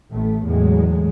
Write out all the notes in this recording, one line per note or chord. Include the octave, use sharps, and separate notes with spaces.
A1 A2 A3
E2 A2 F#3 G#3